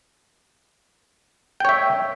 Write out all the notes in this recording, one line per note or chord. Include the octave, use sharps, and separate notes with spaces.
C#5 E5 G5